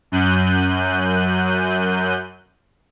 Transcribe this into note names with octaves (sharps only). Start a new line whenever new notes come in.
F#2 F#6 G6 D#7